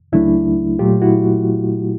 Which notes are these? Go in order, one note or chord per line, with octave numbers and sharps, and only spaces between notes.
C#2 C#3 F#3 A3 D4 E4
A#2 F#3 A3 F4 G4
E4 F#4